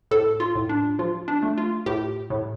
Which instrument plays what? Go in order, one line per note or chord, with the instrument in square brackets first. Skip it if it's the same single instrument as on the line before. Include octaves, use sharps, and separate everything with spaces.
[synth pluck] A2 A4
F4
A2
D4
F3 F4
D4
A3
F4
A2 G4
A2